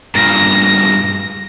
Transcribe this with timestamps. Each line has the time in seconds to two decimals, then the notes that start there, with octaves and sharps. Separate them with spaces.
0.15 G2 A#2 A#6